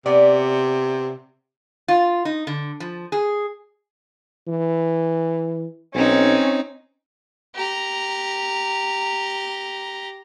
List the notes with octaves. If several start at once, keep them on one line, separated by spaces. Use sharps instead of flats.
C3 B3 D5
F4
D#4
D3
F3
G#4
E3
B1 C4 C#4 D#4
G4 A#5